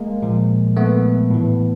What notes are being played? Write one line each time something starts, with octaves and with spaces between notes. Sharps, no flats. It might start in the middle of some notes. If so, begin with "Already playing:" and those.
Already playing: G#3 A#3
A#2 F3
A3 B3
A2 E3